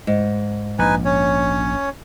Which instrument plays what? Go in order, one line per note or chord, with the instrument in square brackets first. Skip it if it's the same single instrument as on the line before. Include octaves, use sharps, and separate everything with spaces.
[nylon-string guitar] G#2
[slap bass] A#1 [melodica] D#4 B4 G#5
[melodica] C#4 C#5